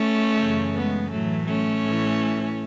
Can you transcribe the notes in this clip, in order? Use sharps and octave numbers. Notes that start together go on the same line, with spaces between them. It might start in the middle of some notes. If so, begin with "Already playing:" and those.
Already playing: A3 C#4
F#2 C#3 E3
G#3 B3
A2 E3 F#3 A3
A3 C#4
A2 E3